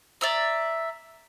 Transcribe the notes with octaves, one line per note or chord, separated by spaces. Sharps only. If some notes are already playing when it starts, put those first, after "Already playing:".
D5 E5 A#5